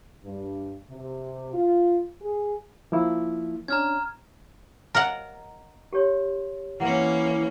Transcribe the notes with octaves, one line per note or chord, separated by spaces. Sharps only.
G2
C3
F4
G#4
F3 A#3 E4
C#4 D4 A#5 F6 G#6
A#4 D#5 F#5 A#5
G4 C#5 C6
E3 A#3 C#4 F#5 A#5